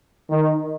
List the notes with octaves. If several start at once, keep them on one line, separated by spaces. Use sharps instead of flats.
D#3